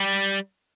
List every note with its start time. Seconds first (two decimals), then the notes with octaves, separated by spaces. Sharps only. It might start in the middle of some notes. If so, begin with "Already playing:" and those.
Already playing: G3